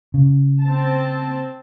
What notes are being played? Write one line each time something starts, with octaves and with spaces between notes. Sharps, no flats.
C#3
C4 A5